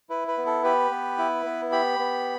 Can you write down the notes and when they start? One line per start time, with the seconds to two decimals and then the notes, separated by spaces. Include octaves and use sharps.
0.09 E4 B4
0.28 B4
0.38 B3
0.46 A4
0.64 G4 B4
0.91 B3
1.18 E4
1.46 B3
1.72 G4 B5
1.99 B3